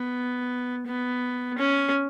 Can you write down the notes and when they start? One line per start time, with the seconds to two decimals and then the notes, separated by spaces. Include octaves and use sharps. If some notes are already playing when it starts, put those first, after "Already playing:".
Already playing: B3
0.86 B3
1.58 C#4